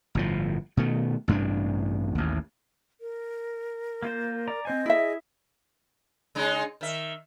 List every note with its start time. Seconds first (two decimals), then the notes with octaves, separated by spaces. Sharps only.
0.15 G1 A2 F3
0.77 B2 D#3 A3
1.28 A1 G2 C3 D4
2.15 A1 D#2
3.01 A#4
4.03 A#3 F4 C5
4.48 D5 A#5
4.65 C4 C5 D#5 G#5
4.86 E4 G#4 E5
6.35 C#3 G#3 D#4
6.81 D#3 E5